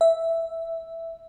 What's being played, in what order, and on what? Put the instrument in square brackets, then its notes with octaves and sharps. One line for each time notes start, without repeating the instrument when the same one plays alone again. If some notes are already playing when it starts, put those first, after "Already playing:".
[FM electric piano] E5